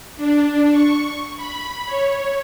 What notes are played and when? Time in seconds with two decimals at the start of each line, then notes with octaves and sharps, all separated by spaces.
0.17 D4
0.71 C#6
1.37 B5
1.86 C#5